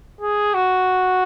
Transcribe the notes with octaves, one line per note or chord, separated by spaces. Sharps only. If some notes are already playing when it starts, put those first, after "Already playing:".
G#4
F#4